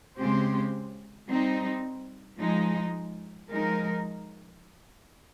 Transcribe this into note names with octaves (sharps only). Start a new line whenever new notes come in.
C#3 G#3 C4 G4 C5
G3 C4 D#4
F3 G#3 D#4
F3 G#3 D#4 A#4